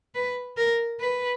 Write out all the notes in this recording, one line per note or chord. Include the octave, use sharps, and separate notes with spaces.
B4
A#4
B4